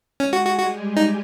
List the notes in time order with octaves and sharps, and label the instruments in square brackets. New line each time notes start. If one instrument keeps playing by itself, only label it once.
[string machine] G#3 G#4 [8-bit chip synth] C#4
[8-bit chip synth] F#4
F#4
[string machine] G3 G4 [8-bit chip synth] F#4
[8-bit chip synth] D#4